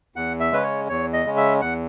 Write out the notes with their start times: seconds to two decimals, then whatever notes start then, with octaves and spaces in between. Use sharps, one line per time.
0.16 E2 F#5
0.40 E5
0.52 C#3 G#3 C#4 B4
0.64 C#5
0.89 E2 C#5
1.13 D#5
1.25 C#3 G#3 C#4
1.37 E5
1.61 E2 F#5